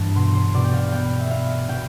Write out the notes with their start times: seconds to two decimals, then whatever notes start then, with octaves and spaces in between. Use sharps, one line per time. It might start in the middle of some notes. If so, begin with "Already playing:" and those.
Already playing: G2 E3 A5
0.16 B2 C6
0.35 C6
0.54 B2 D5
0.64 G5
0.73 F5
0.92 B3 G5
1.19 E5
1.31 B3 F5
1.68 B2 G5